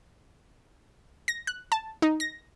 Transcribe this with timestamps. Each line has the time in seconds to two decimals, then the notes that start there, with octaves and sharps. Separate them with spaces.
1.28 A#6
1.47 F#6
1.72 A5
2.02 D#4
2.20 A#6